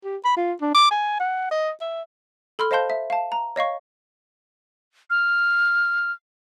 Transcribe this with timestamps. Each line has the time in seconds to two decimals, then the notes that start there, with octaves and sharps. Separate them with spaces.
0.04 G4
0.25 B5
0.37 F4
0.61 D4
0.75 D6
0.91 G#5
1.20 F#5
1.52 D#5
1.81 E5
2.59 A4 B5 C6 F6
2.71 C5 D#5 F5 A5 C6 G6
2.90 E5
3.10 F5 A5
3.32 A#5
3.56 C#5 D#5 F5 C#6
5.10 F6